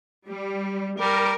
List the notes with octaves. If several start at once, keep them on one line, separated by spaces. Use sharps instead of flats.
G3
G3 A#4